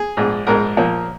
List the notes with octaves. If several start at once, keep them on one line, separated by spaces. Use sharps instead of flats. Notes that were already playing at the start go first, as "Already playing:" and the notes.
Already playing: G#4
A#1 G#2 G#3
A#1 G#2 G#3 A#4
A#2 F3 A#3